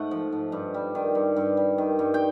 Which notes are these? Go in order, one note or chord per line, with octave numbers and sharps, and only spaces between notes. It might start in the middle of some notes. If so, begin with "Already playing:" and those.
Already playing: G#2 A3 F#5
F3
G#2
G2
G3
D#3
G2
G2
G3
D#3
G2
G5